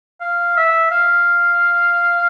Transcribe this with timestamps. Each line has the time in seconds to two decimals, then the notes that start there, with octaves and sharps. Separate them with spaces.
0.21 F5
0.57 E5
0.91 F5